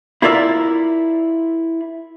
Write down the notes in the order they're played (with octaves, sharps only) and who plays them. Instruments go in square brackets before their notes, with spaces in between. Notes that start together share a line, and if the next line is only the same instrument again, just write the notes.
[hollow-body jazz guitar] E4 F4 A#4 D5 E5